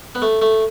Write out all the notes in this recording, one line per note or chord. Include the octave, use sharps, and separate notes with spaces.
B3
A3
A3